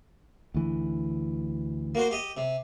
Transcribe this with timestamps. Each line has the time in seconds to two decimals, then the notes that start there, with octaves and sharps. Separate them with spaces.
0.54 D2 E3
1.95 A#3 F#4 C5
2.11 G4 D#5
2.37 C3